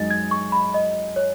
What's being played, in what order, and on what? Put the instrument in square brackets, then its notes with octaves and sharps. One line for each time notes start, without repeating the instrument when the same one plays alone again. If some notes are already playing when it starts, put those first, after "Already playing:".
Already playing: [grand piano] F#2 G#3 D#4 [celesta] A6
[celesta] G#6
C#6
B5
D#5
C#5